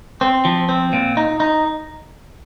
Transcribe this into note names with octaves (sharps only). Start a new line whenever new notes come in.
C4
F3
C4
A#2
D#4
D#4